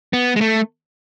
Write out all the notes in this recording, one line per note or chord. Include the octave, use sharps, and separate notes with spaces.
B3
G#3
A3